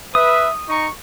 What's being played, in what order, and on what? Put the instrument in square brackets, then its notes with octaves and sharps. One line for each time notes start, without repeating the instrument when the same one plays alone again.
[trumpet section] B4 E5 [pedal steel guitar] D#6
[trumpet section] D#4 A#5 C#6